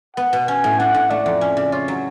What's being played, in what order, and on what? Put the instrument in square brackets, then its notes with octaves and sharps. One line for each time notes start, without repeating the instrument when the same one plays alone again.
[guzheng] B3 [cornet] F#5
[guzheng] B2
[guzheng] C#4 [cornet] G#5
[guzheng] A2
[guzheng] D4 [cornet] F#5
[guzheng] A2
[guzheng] A3 [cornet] D5
[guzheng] F2
C#4
C#3
[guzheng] F4 [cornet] C#5
[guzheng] F#3